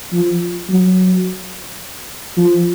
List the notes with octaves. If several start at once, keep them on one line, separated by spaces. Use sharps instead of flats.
F3
F#3
F3